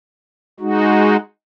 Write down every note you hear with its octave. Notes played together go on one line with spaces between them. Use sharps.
G#3 D#4 F#4